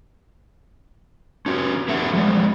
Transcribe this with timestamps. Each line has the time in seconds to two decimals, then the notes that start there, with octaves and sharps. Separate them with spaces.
1.46 C#4 F#4 G4
1.88 A3 B3 G4 E5 F#5
2.13 F3 G3 G#3